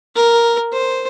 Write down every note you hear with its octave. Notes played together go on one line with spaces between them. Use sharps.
A#4
C5